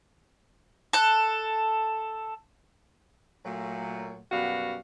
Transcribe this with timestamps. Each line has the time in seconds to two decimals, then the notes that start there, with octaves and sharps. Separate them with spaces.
0.93 A4 F#6
3.44 A#2 F#3 A3
4.30 F#2 B2 G3 B3 F#4 F5